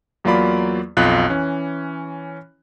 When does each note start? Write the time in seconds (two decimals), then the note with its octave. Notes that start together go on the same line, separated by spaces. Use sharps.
0.24 E2 F#3 A#3 F4 D5 B5
0.97 B1 F2 F4 F#6
1.30 E3 C#4